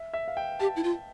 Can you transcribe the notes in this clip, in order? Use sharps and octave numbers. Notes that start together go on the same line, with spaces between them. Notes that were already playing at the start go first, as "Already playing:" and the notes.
Already playing: E5
E5
F5
G5
G4 A5
E4
F4